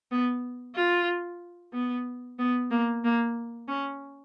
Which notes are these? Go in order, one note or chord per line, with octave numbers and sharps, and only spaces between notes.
B3
F4
B3
B3
A#3
A#3
C#4